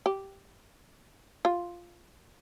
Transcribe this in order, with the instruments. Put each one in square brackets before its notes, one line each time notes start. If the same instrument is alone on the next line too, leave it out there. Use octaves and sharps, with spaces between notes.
[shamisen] G4
F4